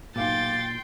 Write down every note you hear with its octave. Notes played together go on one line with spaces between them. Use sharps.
B1 A#2 F5 G5 C6 D6 A6